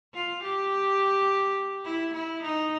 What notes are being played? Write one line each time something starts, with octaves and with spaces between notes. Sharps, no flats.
F4
G4
E4
E4
D#4